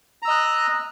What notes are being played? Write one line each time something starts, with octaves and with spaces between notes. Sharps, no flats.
D#5 A#5 E6 F#6